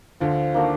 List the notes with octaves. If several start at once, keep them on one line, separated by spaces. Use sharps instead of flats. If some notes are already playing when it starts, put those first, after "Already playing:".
D2 D3 F3
D#3 A#3 D4 F#4